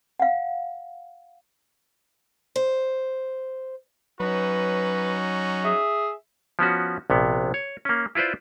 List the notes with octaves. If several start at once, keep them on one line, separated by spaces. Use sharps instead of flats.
F5 F#5
C5
F#3 C#4 D#4 F#4 B4
G#4 E5
F3 B3 C#4 F#4
A#1 C3 B3
C#5
A#3 C#4
E4 F4 B4 C5 D5